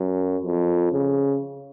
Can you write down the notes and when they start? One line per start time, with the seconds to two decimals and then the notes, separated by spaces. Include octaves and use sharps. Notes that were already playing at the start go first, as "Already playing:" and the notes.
Already playing: F#2
0.42 F2
0.93 C#3